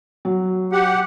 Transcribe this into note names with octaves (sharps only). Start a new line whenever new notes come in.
F#3
G4 F#5